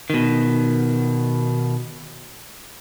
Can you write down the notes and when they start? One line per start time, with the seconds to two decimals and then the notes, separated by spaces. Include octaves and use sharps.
0.10 B2 D#3